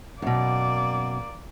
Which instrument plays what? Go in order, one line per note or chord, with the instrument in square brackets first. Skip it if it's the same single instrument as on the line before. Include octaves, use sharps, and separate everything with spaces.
[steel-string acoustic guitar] F#2 B2 [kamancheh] A#3 D5